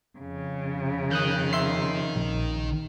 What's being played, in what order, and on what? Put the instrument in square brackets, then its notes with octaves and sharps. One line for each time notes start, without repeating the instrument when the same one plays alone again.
[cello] F2 C#3
[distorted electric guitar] D#3 [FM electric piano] D#6 F#6 G6
[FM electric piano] E5 C6 C7
A#1